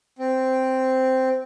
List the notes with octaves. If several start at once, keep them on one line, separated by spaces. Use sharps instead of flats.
C4